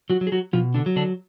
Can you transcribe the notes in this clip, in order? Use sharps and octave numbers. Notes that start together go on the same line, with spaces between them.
F#3 F#4
F#3
G#4
F#3 F#4
B2 F3 F4
D3 D4
F#3
D3 D4